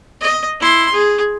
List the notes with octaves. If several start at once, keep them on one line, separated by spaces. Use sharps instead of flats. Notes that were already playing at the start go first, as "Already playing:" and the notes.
D#5
E4 C6
G#4